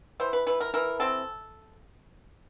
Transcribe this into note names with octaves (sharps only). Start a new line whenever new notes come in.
E3 C5
B4
E3 B4
A#4
E3 A#4
C4 A4